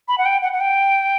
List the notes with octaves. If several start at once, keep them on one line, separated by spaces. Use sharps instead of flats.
B5
F#5
G5
F#5
F#5
G5